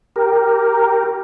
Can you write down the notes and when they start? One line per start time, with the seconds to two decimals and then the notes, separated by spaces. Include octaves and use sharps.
0.16 G4 A#4